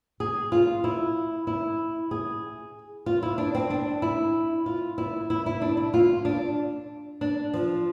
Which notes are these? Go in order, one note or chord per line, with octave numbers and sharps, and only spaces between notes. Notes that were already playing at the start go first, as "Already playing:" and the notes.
G#4
F4
E4
E4
G#4
F4
E4
D4
C4
D4
E4
F4
E4
E4
E4
D4
E4
F4
D4
D4
F3